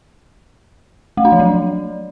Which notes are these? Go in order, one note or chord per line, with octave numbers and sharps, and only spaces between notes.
A3
D4
F3
F#3